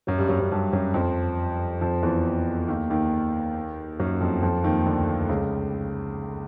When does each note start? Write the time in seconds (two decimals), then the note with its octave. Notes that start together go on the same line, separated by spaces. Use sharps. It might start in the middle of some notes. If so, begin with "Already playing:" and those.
0.07 F#2 F#3
0.18 G2 G3
0.29 F#2 F#3
0.40 F#2 F#3
0.51 G2 G3
0.73 F#2 F#3
0.94 F2 F3
1.81 F2 F3
2.03 E2 E3
2.68 D#2 D#3
2.90 D#2 D#3
3.99 F#2 F#3
4.21 F2 F3
4.43 F2 F3
4.64 D#2 D#3
4.86 D2 D3
5.29 C#2 C#3